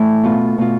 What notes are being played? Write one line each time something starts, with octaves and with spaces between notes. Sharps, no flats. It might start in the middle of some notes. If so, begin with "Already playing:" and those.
Already playing: A2 E3 A3 E4
B2 B3 F4
B2 B3 F4